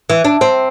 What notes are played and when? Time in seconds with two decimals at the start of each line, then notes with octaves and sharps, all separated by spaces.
0.10 E3
0.25 D4
0.41 C4